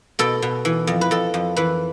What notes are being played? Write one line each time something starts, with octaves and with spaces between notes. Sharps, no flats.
B2 A4
B2
E3
F2
B4
F2 A4
F2
E3 B4